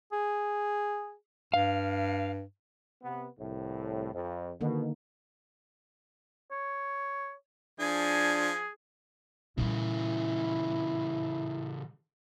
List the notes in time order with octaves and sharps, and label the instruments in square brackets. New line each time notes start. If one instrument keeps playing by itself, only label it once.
[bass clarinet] G#4
[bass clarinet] G2 [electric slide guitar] F5
[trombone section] C3 B3
C2 A2
F2
[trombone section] B2 [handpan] D3 D#3 A#3
[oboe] C#5
[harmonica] F3 G#5 [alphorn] D4 [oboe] G#4
[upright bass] A#2 G3 [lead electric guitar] C#3 E3 [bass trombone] E4